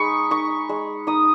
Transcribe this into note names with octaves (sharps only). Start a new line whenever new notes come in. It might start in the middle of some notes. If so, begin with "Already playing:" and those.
Already playing: G#3 D#4 B5 C#6
D#4 C#6
G#3
D#4 D#6